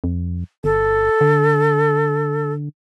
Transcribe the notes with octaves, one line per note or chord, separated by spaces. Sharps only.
F2
G1 A4
D3